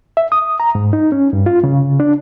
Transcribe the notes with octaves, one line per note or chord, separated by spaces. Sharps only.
E5
D#6
A#5
G#2
D#4
C#4
G2
F4
C#3
D4